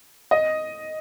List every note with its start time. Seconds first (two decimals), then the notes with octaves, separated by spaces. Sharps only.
0.31 D#5